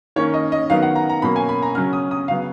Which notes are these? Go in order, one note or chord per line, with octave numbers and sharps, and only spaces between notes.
D#3 A#3 C#4 C#5
D#5
D#5
D#3 F#3 B3 F5
F#5
A#5
A#5
B2 F#3 A#3 C#4 B5
G#5
B5
A#5
C#3 F#3 C#4 F6
D#6
D#6
C#3 F#3 B3 F5